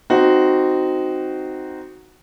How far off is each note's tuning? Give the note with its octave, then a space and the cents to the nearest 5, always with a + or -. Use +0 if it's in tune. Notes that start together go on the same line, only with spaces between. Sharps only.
C4 -15 D#4 +0 F#4 +0